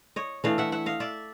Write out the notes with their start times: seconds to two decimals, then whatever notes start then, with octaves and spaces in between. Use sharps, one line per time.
0.16 C#5 D#5
0.44 E3 A3 D4 D#5 F5
0.58 E5 F#5
0.72 E5 F#5
0.86 D#5 F5
1.00 D5 E5